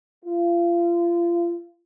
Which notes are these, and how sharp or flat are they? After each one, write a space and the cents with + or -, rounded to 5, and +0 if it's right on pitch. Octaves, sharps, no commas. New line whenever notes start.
F4 -30